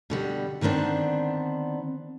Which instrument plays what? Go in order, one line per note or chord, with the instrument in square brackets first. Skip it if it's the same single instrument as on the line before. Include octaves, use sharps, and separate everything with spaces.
[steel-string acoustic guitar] B2 D3 G3
D3 D#3 B3 C4 D4